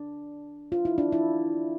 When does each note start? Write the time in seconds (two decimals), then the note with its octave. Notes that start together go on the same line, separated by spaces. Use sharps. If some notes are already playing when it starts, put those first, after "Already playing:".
Already playing: D4
0.72 F4
0.85 E4
0.98 D4
1.12 E4